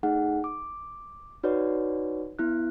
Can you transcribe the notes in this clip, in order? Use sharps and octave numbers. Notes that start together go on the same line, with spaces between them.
A3 D#4 G#4 F#5
D6
D#4 F#4 B4 C#5 D5
B3 E4 F#6